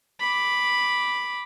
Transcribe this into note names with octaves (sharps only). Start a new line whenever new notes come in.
B5 D6